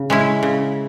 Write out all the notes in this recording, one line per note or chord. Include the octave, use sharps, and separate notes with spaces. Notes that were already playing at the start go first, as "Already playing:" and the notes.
Already playing: C#3
G#3 C#4 E4
C#3